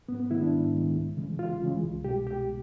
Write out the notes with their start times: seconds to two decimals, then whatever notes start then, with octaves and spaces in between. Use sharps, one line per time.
0.09 G#2 B3
0.20 B3
0.30 D#3 G#3 E4
0.42 D4
0.52 G#2
0.75 D#3 G#3
0.95 C#2
1.17 C#3 E3 G#3
1.39 C#2 F4
1.62 C#3 E3 G#3
1.83 C2
2.04 B2 G#3 G4
2.27 C2 G4